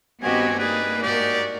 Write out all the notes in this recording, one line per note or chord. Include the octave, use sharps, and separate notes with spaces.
G2 D#3 B3 C4 F#4 G4 D#5 G#5
A#3 D#4 G#4 B4 D5
G#2 F#4 G4 A#4 D5